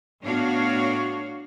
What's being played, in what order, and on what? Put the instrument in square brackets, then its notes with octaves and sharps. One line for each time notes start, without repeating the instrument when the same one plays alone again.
[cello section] A2 B3 D4 F#4 C#5 F5